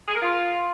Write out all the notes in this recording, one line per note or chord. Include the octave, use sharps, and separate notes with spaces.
G#4
A#4
F4